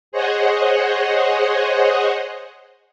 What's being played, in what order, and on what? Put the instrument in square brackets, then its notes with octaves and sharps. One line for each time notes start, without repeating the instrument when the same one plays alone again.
[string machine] G#4 C5 C#5 D#5 F#5